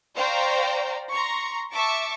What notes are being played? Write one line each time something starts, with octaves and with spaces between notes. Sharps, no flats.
C5 D5 F5 G5 A#5 C#6
A#5 C6 C#6
E5 A5 C#6 D6